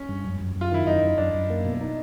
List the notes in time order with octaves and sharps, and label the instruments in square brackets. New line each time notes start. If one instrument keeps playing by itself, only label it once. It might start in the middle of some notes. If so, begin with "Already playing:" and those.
Already playing: [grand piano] C#4
[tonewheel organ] G2
F#2
F#2
F#2
[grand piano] F4
[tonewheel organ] D#3 [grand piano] E4
[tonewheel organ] F#2 [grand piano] D#4
[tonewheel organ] F#2
[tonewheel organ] F#2 [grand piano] D4
[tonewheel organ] F#2
A#3
B2
D#4